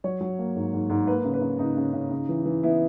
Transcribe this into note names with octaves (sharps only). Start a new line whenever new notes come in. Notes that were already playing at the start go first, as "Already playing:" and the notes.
F#3 C#5
F#3
A#3
G#2
G#2
G#2
A#3 B4
C#3
B4
C#3
C#3 D#4
C#3
C#3
C#3
E3
E3
B3 E4